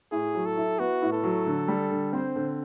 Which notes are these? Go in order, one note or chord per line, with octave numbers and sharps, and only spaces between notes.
A2 G#4
F#3
A4
E4
B3 F#4
A2
A4
F#3
D3
G3
D3
C4 C5
D3